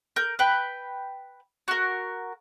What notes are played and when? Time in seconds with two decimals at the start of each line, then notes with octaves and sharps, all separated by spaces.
0.16 A#4 G6
0.39 B4 G5
1.68 F#4 A#4